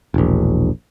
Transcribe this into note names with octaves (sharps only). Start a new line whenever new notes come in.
E1 A#1